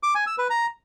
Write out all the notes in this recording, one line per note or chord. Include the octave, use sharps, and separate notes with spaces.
D6
G#5
E6
B4
A#5